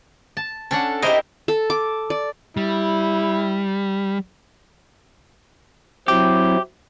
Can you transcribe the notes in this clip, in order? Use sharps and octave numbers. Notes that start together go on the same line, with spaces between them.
A5
C#4 D4 A4 F#5
E4 G4 A#4 C5 D#5
A4
D6
D5
G3 E4
F#3 C4 E4 G4